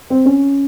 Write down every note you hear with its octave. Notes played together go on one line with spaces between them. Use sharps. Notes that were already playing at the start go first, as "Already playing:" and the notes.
C4
C#4